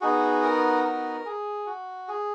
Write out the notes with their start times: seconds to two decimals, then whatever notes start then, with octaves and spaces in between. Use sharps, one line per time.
0.01 B3 D#4 F#4 G#4
0.43 A#4
0.84 A#4
1.25 G#4
1.66 F#4
2.08 G#4